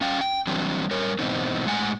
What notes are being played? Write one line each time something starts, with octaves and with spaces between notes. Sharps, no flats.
C#4 F5 G5
G5
E3 F#3 G3 C4 D4
G3 A#4 C#5
G#2 B2 E3 C4 D#4
A2 G#3 F#5 G#5